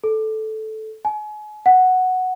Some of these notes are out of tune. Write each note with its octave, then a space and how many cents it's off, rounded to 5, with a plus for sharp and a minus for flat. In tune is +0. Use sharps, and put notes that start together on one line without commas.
A4 -10
G#5 +35
F#5 +0